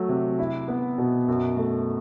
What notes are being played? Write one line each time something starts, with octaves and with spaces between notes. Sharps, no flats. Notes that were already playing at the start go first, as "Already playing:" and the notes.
Already playing: F#3 A3
C3
E4
B3
B2
F#2
A3